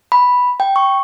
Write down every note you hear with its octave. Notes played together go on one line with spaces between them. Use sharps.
B5
G5
C#6